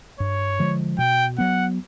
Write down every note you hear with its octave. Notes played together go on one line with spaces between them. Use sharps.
G2 C#5
D3 F3 G#3
B2 G5
F#3 B3 F#5